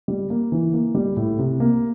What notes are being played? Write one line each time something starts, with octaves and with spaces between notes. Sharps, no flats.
G3
A#3
E3
A#3
G3
A2
C3
A#3